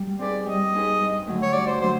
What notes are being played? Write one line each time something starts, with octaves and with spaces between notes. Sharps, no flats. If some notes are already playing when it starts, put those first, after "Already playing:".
Already playing: G3
C4 D#4 G#4 B4 D5
G3 D#5
C4 D#4 G#4 B4
G2
D3 F#3 A3
C#5
G2 D5
C5
D3 F#3 A3 C5